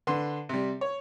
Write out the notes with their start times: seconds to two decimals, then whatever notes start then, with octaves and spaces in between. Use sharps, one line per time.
0.07 D3 B4 C6
0.49 C3 G3
0.81 C#5